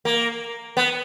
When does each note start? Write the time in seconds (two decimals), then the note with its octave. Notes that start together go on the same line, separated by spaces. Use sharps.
0.05 A#3
0.77 B3